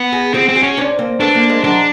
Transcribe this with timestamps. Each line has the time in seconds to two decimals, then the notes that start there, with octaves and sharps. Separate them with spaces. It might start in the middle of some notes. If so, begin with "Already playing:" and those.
Already playing: B3
0.12 F#4 G#4
0.34 C4 F#4 G#4
0.49 C4
0.55 F#4 G#4
0.63 C#4
0.77 C4 D4
0.99 A#3 C4
1.20 A3 B3 D4
1.35 A#3 C4
1.49 G#3 A#3
1.64 F#3 G#3 D4